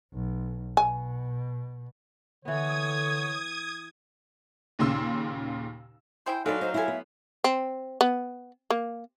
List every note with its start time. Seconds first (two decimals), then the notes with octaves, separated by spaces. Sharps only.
0.14 B1
0.77 B2 G#5
2.45 D3 E3 B3 C#5 D#6 G#6
4.79 D#2 A#2 C#3 C6 E6
6.26 E4 G#4 C5 G5
6.46 F#3 G#3 D#4 A4 B4 D5 F5
6.61 D#4 C5
6.74 G#3 E4 G4 A4 E5 G#5
6.88 B3
7.44 C4
8.01 B3
8.70 A#3